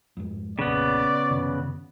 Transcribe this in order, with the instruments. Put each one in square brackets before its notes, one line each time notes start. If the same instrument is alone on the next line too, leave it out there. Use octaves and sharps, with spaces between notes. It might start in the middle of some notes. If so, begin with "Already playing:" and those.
[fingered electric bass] F2 G#2
[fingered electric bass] F1 A#1 [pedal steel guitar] C#3 B3 [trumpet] D5
[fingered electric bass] F#2 C3 D#3